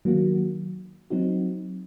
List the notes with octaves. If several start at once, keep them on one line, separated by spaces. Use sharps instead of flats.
D#3 F#3 A#3 F#4
F#3 C4 D#4 F#4